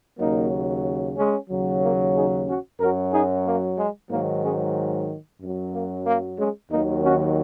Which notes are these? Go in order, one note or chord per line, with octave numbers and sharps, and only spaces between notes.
D#2 C#3 F#3 A#3 D#4
G#3 C#4
D#2 C#3 F#3
A#3
D#4 G#4
C#4 F#4
F#2 F#3 F#4 A#4
D#4 G#4
A#3
G#3
G#2 D#3 F#3 A#3
G#3 C#4
F#2 F#3
A#3
A#3
G#3 C#4
D#2 D#3 F#3 A#3 D#4
C#4 F#4